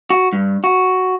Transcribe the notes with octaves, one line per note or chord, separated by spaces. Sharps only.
F#4
G2
F#4